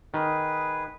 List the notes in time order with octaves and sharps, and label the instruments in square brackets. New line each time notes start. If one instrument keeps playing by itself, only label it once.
[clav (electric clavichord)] D#3 [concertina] G#4 B4